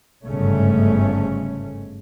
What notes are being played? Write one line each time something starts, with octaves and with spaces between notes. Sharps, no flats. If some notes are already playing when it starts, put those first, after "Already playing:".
G1 G#2 C#3 A3 C#4